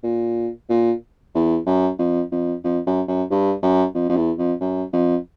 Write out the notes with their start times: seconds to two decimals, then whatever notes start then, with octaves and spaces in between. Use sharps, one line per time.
0.03 A#2
0.69 A#2
1.35 E2
1.66 F#2
1.99 F2
2.32 F2
2.64 F2
2.86 F#2
3.08 F#2
3.31 G2
3.63 F#2
3.95 F2
4.09 F2
4.16 E2
4.38 F2
4.61 F#2
4.93 F2